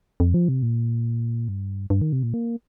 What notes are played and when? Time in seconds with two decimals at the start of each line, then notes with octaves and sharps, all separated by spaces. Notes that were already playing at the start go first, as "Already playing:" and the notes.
0.20 F2
0.34 F3
0.49 C3
0.63 A#2
1.48 G2
1.90 G2
2.02 D#3
2.13 C3
2.23 A#2
2.34 A#3